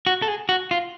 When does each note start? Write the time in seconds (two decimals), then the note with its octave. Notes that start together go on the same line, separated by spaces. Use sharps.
0.06 F#4
0.22 A4
0.28 G#4
0.49 F#4
0.71 F4